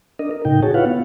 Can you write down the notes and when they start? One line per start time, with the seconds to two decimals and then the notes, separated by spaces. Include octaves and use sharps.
0.19 D4 A#4 D#5
0.31 A#4
0.45 A2 C#3 D#4 G5
0.63 F#4 G#4 C#5 A5
0.74 E4 F4 B4 C#5 F5 F#5
0.86 B3